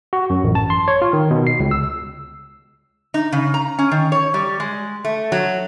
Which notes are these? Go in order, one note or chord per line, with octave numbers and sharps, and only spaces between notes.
F#4
F#2
A1
A5
C6
C#5
F4
D#3
B2
C7
C#2
E6
D#4
C#3
A#5
C#4
D#3
C#5
G3
G#3
A3
F#3